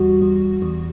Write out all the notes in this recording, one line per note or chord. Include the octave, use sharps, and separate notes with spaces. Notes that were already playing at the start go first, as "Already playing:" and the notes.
Already playing: E2 G3 F#4
E2
E2